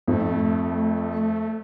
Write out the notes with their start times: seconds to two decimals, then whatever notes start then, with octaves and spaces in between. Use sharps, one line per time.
0.08 F2 A3